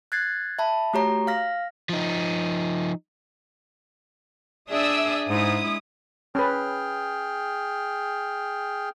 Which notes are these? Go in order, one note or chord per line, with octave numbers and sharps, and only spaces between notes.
F#6 G#6 A6 C7
E5 A5 B5
A3 F#4 G4 C#5 A#5
F5 F6 A#6
F3 D#4
D4 G#4 D5 E5 D#6 E6
G#2 G#3 E4 D#6
C#4 G#4 B4 G5 F6